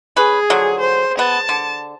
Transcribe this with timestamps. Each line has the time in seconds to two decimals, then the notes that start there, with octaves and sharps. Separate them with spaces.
0.17 C#4 G#4 B4
0.50 D3 F3 F#3
0.81 C5
1.19 B3 A5
1.49 D3